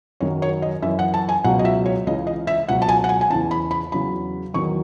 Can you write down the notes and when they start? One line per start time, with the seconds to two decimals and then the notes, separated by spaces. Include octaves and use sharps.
0.20 F#2 D#3 F#3 C#5
0.42 C#5
0.62 D#5
0.82 F#2 E3 E5
0.99 F#5
1.14 A5
1.29 G#5
1.44 C#2 B2 F#3 F#5
1.59 D#5
1.65 E5
1.86 C#5
2.07 C#2 C#3 E3 D#5
2.27 D#5
2.47 E5
2.69 C#2 B2 F#3 F#5
2.82 A5
2.89 G#5
3.04 F#5
3.09 G#5
3.21 G#5
3.30 E2 C#3 E3 A5
3.51 B5
3.71 B5
3.92 E2 C#3 F#3 B5
4.54 E2 D#3 F#3 C#6